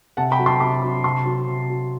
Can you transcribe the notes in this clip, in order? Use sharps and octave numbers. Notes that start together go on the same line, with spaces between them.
C3 F#5 A5
G5 B5
F#3
A5 C6
C3 B5 D6
F#3
C3 A5 C6
F#3
C3
F#3